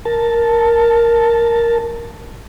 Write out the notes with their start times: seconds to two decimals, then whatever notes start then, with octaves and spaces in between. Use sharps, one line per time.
0.05 A#4 A5